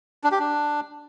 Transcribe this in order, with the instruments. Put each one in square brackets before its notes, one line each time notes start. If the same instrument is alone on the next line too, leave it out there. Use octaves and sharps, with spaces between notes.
[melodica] D4
G4
D4